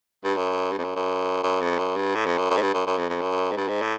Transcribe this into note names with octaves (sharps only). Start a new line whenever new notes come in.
G2
F#2
G2
F2
F#2
F#2
F#2
F2
F#2
G2
A2
F2
F#2
F#2
G#2
G2
F#2
F#2
F2
F2
F#2
G#2
G2
G#2
A2